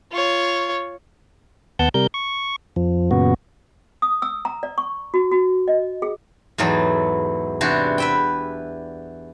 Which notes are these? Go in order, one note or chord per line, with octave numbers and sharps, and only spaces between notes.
F4 C#5
D#2 B3 F#5 A5 G6
C3 G3 A#4 G6
C#6
F2 F3
F#2 A#2 C#3 B3 F#4
D#6
E6
A#5
D5
C#6
F#4
F#4
D#5
G#4
E2 G#2 E3 F#3 A4
C3 E3 D4 F#4 C5
B4 E5 G5